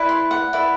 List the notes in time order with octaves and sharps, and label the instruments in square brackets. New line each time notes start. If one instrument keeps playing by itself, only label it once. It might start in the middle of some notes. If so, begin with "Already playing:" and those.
Already playing: [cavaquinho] E4 B4 D5
C6
F#5
E4 B4 D5